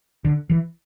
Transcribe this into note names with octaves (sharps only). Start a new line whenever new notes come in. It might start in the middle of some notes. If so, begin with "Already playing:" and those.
D3
E3